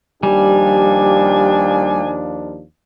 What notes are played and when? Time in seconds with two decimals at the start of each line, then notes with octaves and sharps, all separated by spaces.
0.23 D#2 F3 G3 D4 G4 G#5